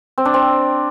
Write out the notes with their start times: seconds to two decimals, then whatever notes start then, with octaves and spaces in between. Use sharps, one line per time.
0.18 C4
0.25 D4
0.34 C4